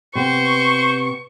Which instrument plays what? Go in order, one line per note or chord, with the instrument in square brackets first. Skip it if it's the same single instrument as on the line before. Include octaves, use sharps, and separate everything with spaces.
[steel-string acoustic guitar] C3 B3 B4 [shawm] C5 [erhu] C#6